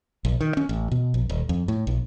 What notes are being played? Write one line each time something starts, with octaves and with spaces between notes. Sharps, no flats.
A#1
D#3
C#4
A1
B2
A#1
D#1
F2
A2
A#1